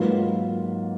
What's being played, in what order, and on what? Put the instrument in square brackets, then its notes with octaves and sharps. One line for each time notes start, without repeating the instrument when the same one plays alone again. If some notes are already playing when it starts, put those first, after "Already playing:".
Already playing: [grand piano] G#2 F#3 A#3 F4 B4